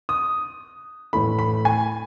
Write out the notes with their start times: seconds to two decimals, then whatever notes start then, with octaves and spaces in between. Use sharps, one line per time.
0.09 D#6
1.13 A2 E3 A3 B5
1.39 B5
1.65 G#5